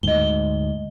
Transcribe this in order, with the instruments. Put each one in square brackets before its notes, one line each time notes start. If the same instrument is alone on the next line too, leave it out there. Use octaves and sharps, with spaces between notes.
[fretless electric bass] D2 G#2 [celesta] D#5 G7